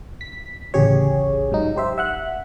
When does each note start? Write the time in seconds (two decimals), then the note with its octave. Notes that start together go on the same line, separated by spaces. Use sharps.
0.21 B6
0.74 A1 D2 C#3 G4 G#4 C#5
1.52 G#2 F#3 D#4
1.76 G4 C5 E5
1.98 E5 F#5 F#6